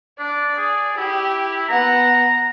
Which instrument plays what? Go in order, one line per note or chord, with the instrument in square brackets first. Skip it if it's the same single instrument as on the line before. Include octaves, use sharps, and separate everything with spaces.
[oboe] D4 [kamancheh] D5
[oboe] G#4
[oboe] E4 [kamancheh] G4
[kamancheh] B3 F#5 [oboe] A#5